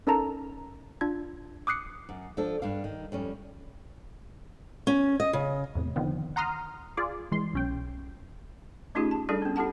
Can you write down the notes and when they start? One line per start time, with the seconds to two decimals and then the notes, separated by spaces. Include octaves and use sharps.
0.07 C#4 D#4 A4 A#4 A5 A#5
1.01 D4 F4 G#6
1.67 D6 D#6 F#6 C7 C#7
2.09 F#2
2.37 F3 D4 A4
2.62 G2 D4 F5
2.84 D#3
3.12 F2 G3 C#4
4.87 C#4
5.20 D#5
5.33 C#3
5.75 E2 A2 C3
5.96 D3 D#3 F3 B3 C4
6.36 F#5 A#5 C6 D#6 F6
6.97 F4 G#4 D5
7.32 E3 G#3 C6
7.53 B1 C#4 G5
8.95 A3 C#4 D#4 F4 G4 G#4
9.11 A5
9.29 G3 D4 E4 G#4 A4 D5
9.42 B3 C#4
9.56 E4 G4 A4 F#5 A5